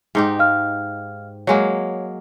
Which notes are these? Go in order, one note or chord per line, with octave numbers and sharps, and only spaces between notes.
G#2 D#4 G4
F5 F6
F#3 G#3 A#3 C#5